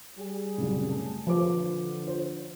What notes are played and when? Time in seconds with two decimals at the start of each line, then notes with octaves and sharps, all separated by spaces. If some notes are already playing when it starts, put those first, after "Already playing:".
0.18 G3 G#4
0.58 C2 F#2 C#3
0.89 A3
1.27 D3 F3 B4 C5 D6
2.07 F4 C5